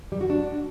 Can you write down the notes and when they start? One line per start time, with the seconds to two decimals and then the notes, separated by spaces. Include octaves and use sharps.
0.12 G3
0.21 F#4
0.30 D4